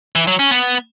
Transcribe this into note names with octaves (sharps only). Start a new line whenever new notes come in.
E3
F#3
C#4
B3